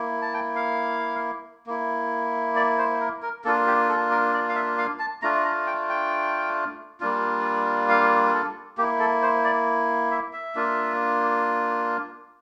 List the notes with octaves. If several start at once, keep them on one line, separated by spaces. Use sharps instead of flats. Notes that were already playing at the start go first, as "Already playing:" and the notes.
Already playing: A#3 E4
A5
G5
F5
A#3 E4
D5
C5
A#4
A#4
A#3 D4 F4 A4
G4
A4
A#4
D5
F5
E5
F5
A5
A3 D4 F4 A#5
A#5
G5
G5
G3 A#3 D4 F4
F5
A4
A#3 E4 G4
A4
C5
D5
E5
E5
A#3 D4 F4